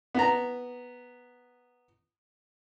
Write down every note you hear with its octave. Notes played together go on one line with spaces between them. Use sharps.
B3 A#5